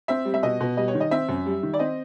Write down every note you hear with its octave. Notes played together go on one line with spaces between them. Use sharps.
C4 E5
G3
E5
B2 D#5
B2
G3 D#5
C#5
D#3
D#5
C4 E5
F#2
G3
D#3
D5
C4 D#5